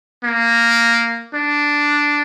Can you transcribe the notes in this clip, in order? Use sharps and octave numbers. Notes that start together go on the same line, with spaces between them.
A#3
D4